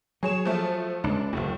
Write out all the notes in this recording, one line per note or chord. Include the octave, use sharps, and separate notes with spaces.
F#3 G#4 C#5 E7
F3 A3
C#2 D4
F#1 D2 A2